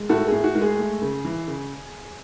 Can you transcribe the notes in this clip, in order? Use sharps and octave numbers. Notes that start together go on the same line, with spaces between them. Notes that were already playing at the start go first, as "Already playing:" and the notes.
Already playing: G#3
A2 F#4 A4
G#4
A2
F#4
G#3
G#4
A3
C#3
E3
C#3